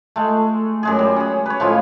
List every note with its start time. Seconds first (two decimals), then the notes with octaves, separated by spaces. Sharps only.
0.16 G#3 A3
0.83 F#2 G#3 G#4
0.99 G3
1.16 C#4 G#4
1.46 B4 C#5
1.60 A2 F3 G#3 F4